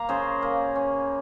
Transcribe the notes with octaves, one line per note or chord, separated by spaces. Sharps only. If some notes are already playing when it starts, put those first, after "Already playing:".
Already playing: A#3 F5 A#5
C#3 G#4 C5
A#3
C#4